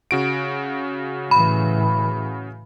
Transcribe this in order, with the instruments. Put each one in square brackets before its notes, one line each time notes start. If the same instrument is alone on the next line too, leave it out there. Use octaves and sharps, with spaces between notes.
[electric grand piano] C#3 F#4 D7
[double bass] A2 E3 [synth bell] B5